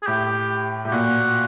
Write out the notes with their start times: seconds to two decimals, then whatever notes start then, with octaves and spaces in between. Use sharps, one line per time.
0.03 G#4
0.07 A2 G4
0.85 A2
0.88 G4
0.91 A#2 F#4